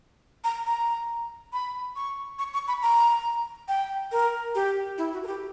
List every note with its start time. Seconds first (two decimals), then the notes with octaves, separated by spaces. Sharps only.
0.44 A#5
0.66 A#5
1.53 B5
1.96 C#6
2.39 C#6
2.53 C#6
2.68 B5
2.82 A#5
3.68 G5
4.12 A#4
4.55 G4
4.98 E4
5.13 F#4
5.23 A#4
5.27 G4